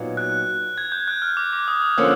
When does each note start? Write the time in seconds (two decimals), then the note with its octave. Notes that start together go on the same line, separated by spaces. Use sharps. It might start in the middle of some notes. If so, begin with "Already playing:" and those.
Already playing: A#2 F#3 B3 D#4
0.17 F#6
0.78 G#6
0.92 G6
1.08 F#6
1.22 F6
1.37 D6
1.53 D6
1.68 D#6
1.82 D#6
1.97 D3 F3 A#3 C#4 E6